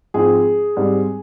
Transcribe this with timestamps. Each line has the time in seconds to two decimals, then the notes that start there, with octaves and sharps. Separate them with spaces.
0.14 G#2 F3 G#3 C4 G#4
0.77 G#2 G3 C4